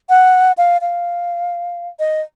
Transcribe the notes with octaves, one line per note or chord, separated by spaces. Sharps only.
F#5
F5
F5
D#5